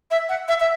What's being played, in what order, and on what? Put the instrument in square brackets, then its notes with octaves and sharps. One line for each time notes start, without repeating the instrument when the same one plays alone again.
[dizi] E5
F#5
E5
E5